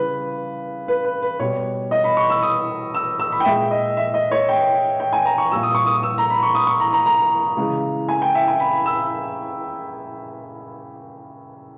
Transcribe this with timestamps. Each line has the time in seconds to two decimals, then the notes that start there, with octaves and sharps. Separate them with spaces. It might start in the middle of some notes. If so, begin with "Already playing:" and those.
Already playing: C#3 E3 G3 B4
0.88 B4
1.05 B4
1.22 B4
1.40 B2 G3 C#5
1.91 D#5
2.04 B5
2.17 C#6
2.30 E6
2.43 D#6
2.94 E6
3.20 E6
3.32 B5
3.40 G5
3.45 A#2 G#3 E5
3.71 D#5
3.97 E5
4.14 D#5
4.31 C#5
4.49 G5
5.00 G5
5.13 G#5
5.26 A#5
5.38 C#6
5.52 A#2 G3 E6
5.63 D#6
5.75 C#6
5.86 D#6
5.97 D#6
6.03 E6
6.18 A#5
6.30 B5
6.43 C#6
6.55 D#6
6.67 C#6
6.80 A#5
6.93 A#5
7.06 A#5
7.57 C#3 E3 G#3
8.09 G#5
8.22 G5
8.35 E5
8.48 G#5
8.60 B5
8.86 E6